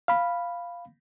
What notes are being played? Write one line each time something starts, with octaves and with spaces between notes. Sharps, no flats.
F5 B5